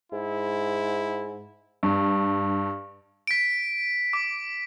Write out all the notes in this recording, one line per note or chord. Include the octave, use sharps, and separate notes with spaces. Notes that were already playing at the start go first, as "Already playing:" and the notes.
G#2 E4
G2
B6 D7
D6